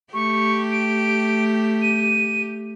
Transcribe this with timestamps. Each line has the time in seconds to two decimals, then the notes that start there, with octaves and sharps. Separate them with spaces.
0.14 A3 G4 C#6
0.72 D7
1.82 D#7